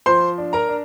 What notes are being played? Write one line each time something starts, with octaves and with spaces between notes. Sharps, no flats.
F3 C5 C6
D4
A#4 A#5
D4